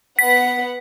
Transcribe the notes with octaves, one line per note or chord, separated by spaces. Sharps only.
B3 F#5 B6